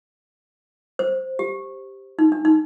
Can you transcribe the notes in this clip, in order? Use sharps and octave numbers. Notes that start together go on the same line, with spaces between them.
C5
G4
D#4
D4
D#4